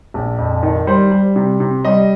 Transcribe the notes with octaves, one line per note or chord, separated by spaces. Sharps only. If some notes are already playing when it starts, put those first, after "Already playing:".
A#1
F2
D#3
G3 C5
G3
C3
C3
G3 D#5